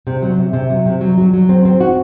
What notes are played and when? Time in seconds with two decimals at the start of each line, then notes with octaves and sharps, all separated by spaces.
0.07 C3
0.22 F#3
0.38 C3
0.53 C3
0.70 F#3
0.86 C3
1.01 F#3
1.18 F#3
1.33 F#3
1.49 C4
1.65 C4
1.81 F#4